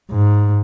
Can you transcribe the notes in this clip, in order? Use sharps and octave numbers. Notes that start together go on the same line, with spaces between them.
G#2